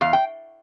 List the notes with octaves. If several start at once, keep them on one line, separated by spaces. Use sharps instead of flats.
E2 F5
G5